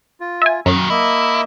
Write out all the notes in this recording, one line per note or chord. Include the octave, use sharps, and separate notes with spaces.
F4
E5 G#5
F#2 A#2 D#3 F#4
A#3 E4 D#5 E5